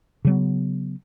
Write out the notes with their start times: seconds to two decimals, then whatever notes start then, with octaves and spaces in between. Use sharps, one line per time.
0.25 C#3 F#3 B3